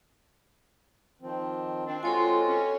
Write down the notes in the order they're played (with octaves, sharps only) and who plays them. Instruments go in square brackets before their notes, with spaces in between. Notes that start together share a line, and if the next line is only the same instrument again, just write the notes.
[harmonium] D#3 F3 C4
[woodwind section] C4 D4
[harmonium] G#3 C4 F#4 [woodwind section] F4 [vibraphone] A4 C#5 G#5
[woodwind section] C#4